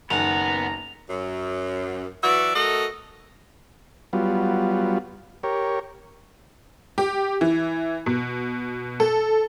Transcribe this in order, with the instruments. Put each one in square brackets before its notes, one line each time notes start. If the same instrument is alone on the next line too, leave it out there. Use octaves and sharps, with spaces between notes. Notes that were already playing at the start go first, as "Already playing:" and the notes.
[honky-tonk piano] F#1 D#3 [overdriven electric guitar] B3 F#5 [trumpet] A#5 [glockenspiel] F7
[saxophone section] F#2
E3 F#3 F#4 D5 E5
A3 F#4 A4 A#4 D#5
[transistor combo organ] F#3 G3 B3 F4
G4 A#4 C#5
[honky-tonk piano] G4
E3
B2
A4